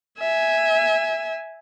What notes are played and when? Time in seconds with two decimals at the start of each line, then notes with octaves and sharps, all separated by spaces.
0.19 E5 G#5